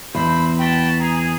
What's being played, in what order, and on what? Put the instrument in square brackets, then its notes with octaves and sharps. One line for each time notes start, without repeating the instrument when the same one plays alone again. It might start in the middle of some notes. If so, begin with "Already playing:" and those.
[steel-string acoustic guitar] E2 [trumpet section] C4 C5 [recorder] B5
[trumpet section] F#4 A5 B5 [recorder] G5
[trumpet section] G#4 [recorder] A#5